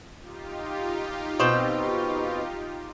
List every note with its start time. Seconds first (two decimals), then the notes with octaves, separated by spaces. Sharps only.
0.20 D#4 F4 G4
1.40 B2 C4 G5